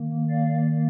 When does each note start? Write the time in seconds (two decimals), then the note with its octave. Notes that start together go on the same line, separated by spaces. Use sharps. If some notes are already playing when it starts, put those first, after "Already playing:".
Already playing: D#3 A#3
0.30 D5 F5